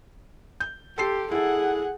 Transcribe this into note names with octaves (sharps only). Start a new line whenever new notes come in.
G6
G4 A4 C6 C7
E4 G#4 A4 F#5